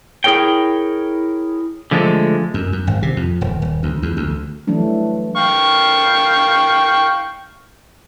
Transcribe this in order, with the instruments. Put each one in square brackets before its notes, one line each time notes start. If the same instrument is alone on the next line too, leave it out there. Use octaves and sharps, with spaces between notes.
[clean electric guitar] E4 G#4 A#4 C#5 G5
D3 F3 G#3 A3 A4
[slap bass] F#2
F#2
G#1
C3
F2
D#1
D#1
D2
E2
D2
[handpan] E3 F#3 G3 A3 D4
[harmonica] F5 G5 C#6